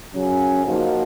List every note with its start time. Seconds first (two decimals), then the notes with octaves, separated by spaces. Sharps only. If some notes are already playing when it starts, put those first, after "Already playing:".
0.14 F#2 C#3 F#3 C#4
0.65 F3 A#3 D#4 F#4